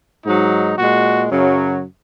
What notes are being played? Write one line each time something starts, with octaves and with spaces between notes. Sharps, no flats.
G#2 F#3 D#4
A#2 G#3 F#4
F#2 C#3 F#3